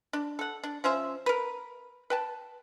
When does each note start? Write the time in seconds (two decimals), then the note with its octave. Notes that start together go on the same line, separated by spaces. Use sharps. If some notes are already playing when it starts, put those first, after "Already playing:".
0.13 D4
0.39 A4 F#5
0.63 D4
0.84 F3 C#4 C5 E5
1.26 A#4 B4
2.10 B4 G5 A5